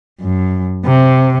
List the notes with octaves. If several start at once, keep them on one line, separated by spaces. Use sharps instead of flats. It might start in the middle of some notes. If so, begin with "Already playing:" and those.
F#2
C3